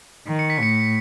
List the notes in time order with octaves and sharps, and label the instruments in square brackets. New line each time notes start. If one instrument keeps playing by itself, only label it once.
[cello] D#3
[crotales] C#7
B6
[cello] A2 [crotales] C#7